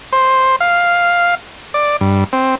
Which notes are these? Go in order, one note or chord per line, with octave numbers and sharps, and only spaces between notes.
C5
F5
D5
G2
C4